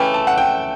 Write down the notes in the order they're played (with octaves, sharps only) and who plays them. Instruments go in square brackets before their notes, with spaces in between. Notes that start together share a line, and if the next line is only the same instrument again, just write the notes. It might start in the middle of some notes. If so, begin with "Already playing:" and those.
Already playing: [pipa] C#3 E3 A3 [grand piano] G5
[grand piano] A5
F#5
G5